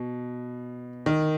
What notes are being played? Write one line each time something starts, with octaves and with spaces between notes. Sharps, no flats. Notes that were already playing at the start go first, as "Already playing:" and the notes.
Already playing: B2
D#3